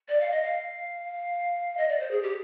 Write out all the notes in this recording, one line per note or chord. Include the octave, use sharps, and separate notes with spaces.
D5
F5
D#5
F5
D#5
D5
C5
G#4
G4